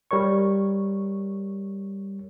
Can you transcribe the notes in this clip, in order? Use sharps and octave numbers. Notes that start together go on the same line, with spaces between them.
G3 A#4 C#5 C#6